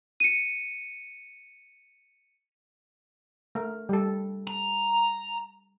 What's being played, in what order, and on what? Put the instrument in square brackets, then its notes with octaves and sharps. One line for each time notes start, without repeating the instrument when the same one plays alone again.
[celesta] C#7 D#7
[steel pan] A3 A#4
G3 A4
[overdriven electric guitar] A#5